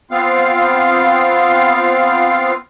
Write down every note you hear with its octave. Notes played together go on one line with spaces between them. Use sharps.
B3 C4 F4 F5